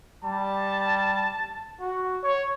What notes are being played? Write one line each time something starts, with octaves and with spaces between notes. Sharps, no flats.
G3 A5
F#4
C#5